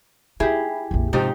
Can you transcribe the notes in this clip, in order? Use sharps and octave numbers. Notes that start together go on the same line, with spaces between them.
D#4 E4 G4 G#4
A#1 F2
G#2 C3 F3 C#4 D#4 G4